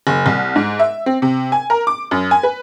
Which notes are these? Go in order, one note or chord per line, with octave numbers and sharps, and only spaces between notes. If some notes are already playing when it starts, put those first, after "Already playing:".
F#1
C2
G#2
E5
C4
C3
G#5
A#4
D6
F#2
G#5
B4